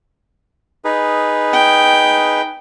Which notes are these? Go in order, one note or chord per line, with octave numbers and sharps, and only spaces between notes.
D#4 G#4 B4
G5